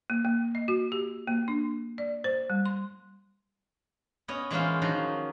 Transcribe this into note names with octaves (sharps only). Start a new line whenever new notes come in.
A#3
A#3
D#5
F#4
G4
A#3
D4
D5
C5
G3
C6
B3 C#4 C#5 D#5
E3 G#3 A#3 C#4 F4 C5
D#3 F3 F#3 D#4 F#4